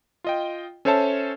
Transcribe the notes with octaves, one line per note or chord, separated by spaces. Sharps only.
F4 D#5 G5
C#4 A4 C5 C#5 E5 A5